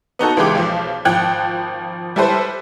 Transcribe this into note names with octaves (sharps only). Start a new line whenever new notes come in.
B3 D#4 F#4 A4
C#2 E3 G#3 G4 D6
B1 F3
G#1 F3 G5 F#6 G#6
G3 E4 A4 B4 C5